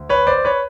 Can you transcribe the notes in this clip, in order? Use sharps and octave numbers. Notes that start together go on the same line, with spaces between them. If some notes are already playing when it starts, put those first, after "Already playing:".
Already playing: D2
B4 C#5
C5 D5
B4 C#5